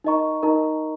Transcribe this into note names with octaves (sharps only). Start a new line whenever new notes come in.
D#4 A#4 D#5 A#5 C#6
D#4 A#4 D#5 A#5 C#6